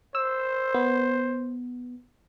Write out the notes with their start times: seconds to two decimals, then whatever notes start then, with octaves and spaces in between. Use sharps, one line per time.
0.15 C5 E6
0.74 B3